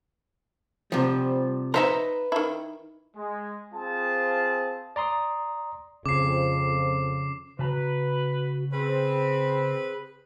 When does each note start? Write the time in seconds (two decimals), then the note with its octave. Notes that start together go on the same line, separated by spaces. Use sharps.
0.92 C3 F3 G3
1.74 D#4 B4 C5 D#5 E5 A#5
2.32 D#3 E4
3.16 G#3
3.74 C4 F4 G#4 C5 A5
4.96 D5 A#5 C6 D#6
6.06 F2 C#3 F3 D6 C7
7.59 C#3 F#4 B4 A5 A#5
8.72 C4 G#4 B4 B5